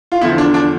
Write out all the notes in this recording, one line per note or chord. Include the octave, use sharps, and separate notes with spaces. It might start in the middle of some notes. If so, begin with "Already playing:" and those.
F4
E2 D3 F3 E4
D4
D4